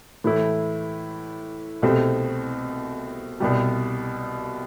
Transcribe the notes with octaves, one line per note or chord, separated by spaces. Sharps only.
A2 E3 A3 E4
C2 B2 A3 C4
C2 B2 G3